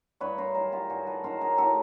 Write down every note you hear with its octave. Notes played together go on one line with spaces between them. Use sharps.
G2 B4 C#5
A#4 C5
D#3 F#3 G#4 A#4
F4 G4
G2 F#4 G#4
A4 B4
D#3 F#3 A#4 C5
G#4 A#4
A2 G4 A4